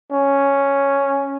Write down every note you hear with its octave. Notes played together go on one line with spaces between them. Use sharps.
C#4